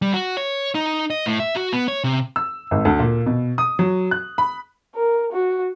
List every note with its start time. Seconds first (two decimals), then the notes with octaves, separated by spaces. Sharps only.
0.02 G3
0.14 F#4
0.37 C#5
0.75 D#4
1.10 D#5
1.26 A2
1.40 E5
1.56 F#4
1.73 B3
1.88 C#5
2.04 C3
2.36 E6
2.71 G#1
2.85 D2
2.99 A#2
3.26 B2
3.58 D#6
3.79 F#3
4.11 F#6
4.38 B5
4.95 A#4
5.32 F#4